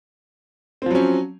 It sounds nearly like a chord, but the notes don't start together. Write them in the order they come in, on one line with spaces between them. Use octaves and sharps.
C4 F3 F#3 C#4